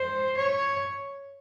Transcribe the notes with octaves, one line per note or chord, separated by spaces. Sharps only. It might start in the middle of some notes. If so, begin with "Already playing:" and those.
Already playing: C5
C#5